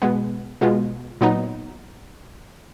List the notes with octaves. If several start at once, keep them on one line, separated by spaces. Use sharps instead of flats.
B2 G#3 B3
B2 G#3 B3 F4
A#2 F#3 B3 D#4